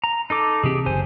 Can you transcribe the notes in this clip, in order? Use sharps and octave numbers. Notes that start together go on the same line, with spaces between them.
A#5
D#4 A4 D6
C3 E3 C4 G4 G#4
F#1 C5 G#5